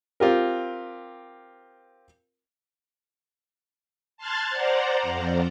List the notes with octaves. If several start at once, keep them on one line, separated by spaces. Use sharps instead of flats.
C4 F4 G4 A#4
A5 C6 F6 F#6 G#6 A6
C5 D5 F#5 A#5
F2